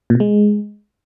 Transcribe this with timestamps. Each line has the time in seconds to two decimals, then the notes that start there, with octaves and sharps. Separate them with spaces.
0.10 A#2
0.15 B2
0.20 G#3